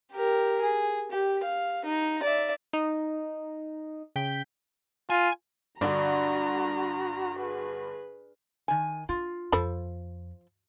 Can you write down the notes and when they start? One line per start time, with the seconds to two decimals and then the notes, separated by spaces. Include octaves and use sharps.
0.13 G4 A#4
0.61 G#4
1.11 G4
1.44 F5
1.85 D#4
2.23 D5 E5
2.73 D#4
4.16 C#3 G5 G6 B6
5.10 F4 G#5
5.81 G2 D3 D4 F#4 A#5
7.39 G#4 B4
8.68 D#3 G#5
9.09 D4 F4
9.52 F2 F3 A4 B5